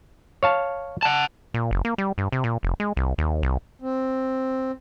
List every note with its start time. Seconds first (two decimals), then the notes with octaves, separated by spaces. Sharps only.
0.43 C#5 F5 A5
1.03 F#5 A5
1.54 A#2
1.71 F#1
1.85 A#3
1.98 G3
2.18 G2
2.32 C3
2.44 A#2
2.63 F1
2.80 G#3
2.97 C2
3.18 D#2
3.43 C2
3.82 C4